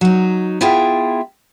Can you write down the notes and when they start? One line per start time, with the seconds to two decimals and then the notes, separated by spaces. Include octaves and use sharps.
0.01 F#3 D#4
0.61 B3 E4 F4 G#4 E5 G5